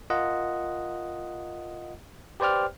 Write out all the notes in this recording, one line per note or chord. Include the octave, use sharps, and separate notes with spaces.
F4 A#4 D#5 F#5
G4 B4 C5 D5 G5 F6